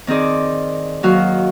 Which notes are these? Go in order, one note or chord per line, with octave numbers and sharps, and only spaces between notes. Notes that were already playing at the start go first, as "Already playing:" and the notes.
D#3 C4 D#4 G#4 D5
D#2 D#3 F#3 F#4 F5